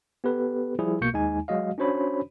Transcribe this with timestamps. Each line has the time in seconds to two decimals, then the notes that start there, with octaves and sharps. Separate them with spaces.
0.24 B3 G4 A4 B4
0.79 F3 G3 E4 G#4
1.01 B1 B2 A#3 C#6 G6 C#7
1.13 D#2 G#3 D#4 G#5
1.48 F#3 G#3 F#4 D#5 F5
1.78 C#4 D4 F#4 C5 C#5 B5